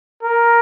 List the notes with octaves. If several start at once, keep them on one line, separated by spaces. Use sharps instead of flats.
A#4